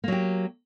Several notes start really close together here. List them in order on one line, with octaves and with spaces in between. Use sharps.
A#3 F#3 G4